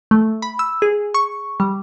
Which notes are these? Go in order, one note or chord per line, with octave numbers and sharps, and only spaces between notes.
A3
B5
E6
G#4
C#6
G3